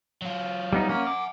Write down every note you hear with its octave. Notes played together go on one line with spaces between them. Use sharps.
F#3 F4
G3 B3 D#4
A#3 C#4 F#5 G#5
D6